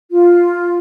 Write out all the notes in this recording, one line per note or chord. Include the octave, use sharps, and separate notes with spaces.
F4